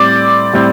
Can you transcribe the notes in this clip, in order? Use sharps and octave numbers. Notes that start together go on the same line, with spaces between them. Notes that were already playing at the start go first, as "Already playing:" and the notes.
Already playing: A2 G3 C4 D5 D6
A2 G3 C4